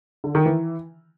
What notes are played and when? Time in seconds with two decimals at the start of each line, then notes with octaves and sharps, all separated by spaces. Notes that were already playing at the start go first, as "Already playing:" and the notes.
0.24 D3
0.35 D#3
0.46 E3